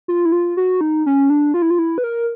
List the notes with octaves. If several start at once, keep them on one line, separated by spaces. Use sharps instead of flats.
F4
E4
F4
F#4
D#4
C#4
D4
F4
E4
F4
E4
B4
A#4